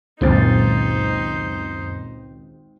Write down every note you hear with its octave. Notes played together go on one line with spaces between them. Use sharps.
G#1 C#2 F#2 A#2 C4 D#4 C5 A6